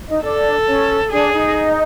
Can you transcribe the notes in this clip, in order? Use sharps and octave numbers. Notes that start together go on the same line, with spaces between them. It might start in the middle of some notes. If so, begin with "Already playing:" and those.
D#4 D#5
D4 A4 D5
C#4 C#5
D4 G#4 D5
D5
D#4 D#5